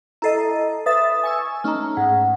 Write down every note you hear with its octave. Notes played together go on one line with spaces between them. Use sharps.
E4 A4 D#5 A#5 C7
B4 E5 D#6 A6
G#5 C#6 E6
A3 C#4 D#4 A#5 F6
G#2 F#5